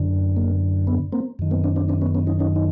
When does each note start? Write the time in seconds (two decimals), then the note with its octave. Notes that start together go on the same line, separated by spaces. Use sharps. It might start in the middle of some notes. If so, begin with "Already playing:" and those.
Already playing: F#2 D3
0.36 A#3
0.87 B3
1.12 A#3 C4
1.39 F#2 D#3
1.51 A#3 C4
1.64 C4 D4
1.76 C4 D4
1.89 C4 D4
2.01 B3 C#4
2.14 B3 C#4
2.27 C#4 D#4
2.39 C#4 D#4
2.56 D#4